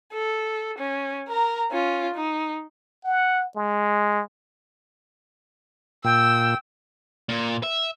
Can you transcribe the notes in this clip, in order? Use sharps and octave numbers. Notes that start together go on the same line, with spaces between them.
A4
C#4
A#4 A#5
C#4 F4
D#4
F#5
G#3
A#2 G5 E6
A#2
E5